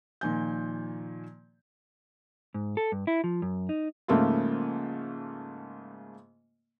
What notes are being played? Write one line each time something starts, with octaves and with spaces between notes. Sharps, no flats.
A#2 D#3 F3 G#5 G6
G#2
A4
G2
E4
F3
F#2
D#4
G#2 C#3 F3 A3 A#3 F4